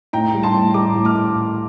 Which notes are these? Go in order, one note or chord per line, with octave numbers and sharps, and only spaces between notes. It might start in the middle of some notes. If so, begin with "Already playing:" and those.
A2 G5 A#5
G3
A5 C6
A2
G3 A#5 D6
A2
D6 F6